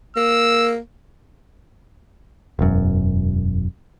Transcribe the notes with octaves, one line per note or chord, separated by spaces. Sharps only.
A#3 E6
E1 F#2